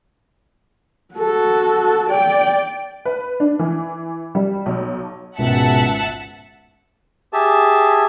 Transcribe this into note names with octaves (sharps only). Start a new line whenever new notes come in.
F#4 A4
D5 G5
B4
D4
E3
G3
B1
G#1 C#2 B2 E5 F#5 A5
G4 G#4 E5 A5